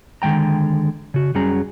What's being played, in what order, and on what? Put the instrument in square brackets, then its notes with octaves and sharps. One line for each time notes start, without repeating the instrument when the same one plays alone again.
[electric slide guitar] D3 D#3 G#3 G5 A#5
C#3 F#4
F#2 F#3 G3 C#4 G#4 A#5